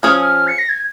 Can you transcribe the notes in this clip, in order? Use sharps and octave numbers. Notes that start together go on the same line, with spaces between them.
F3 C#4 G#4 C#5 F6
D#6
F6
C#7
A#6
G#6